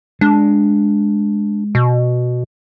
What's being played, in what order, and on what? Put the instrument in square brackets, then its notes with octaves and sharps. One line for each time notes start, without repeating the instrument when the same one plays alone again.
[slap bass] G#3 [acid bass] D4
[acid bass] B2